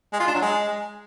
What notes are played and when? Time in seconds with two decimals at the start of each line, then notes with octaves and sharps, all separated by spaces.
0.13 G#3
0.20 F4
0.27 D4
0.35 F#3
0.42 G#3